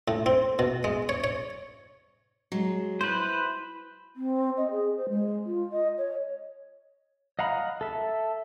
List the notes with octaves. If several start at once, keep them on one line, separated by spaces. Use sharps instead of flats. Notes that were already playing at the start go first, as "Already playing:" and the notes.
A2
C4
B2
G#3
C#5
C#5
F#3 G#3
E4 B4 C5
C4
D#5
G#4
C5
G#3
F4
D#5
C#5
D#5 F5 F#5 A#5 B5
A4 E5